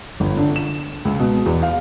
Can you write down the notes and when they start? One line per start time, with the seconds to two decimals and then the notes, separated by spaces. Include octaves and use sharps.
0.20 G1
0.37 D3
0.56 E7
1.05 C#2
1.19 B2
1.46 E2
1.63 F5